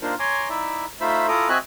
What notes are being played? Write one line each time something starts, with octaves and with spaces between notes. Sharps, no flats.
A#3 D4 D#4 F4 A#4 C5
C#5 G#5 A#5 C6 D6
D#4 E4 D5 E5
A3 D#4 F4 C5 E5 B5
E4 F4 A4 A#5 D6 D#6
C4 F#4 D#5 E5 G#5 F#6